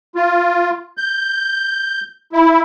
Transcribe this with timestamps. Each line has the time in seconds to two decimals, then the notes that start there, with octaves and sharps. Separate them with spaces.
0.15 F4
0.97 G6
2.33 E4